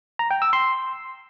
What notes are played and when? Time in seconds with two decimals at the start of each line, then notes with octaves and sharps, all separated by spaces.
0.19 A#5
0.31 G5
0.42 E6
0.53 C6